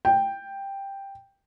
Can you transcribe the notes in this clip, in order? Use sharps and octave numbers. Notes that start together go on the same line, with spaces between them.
G5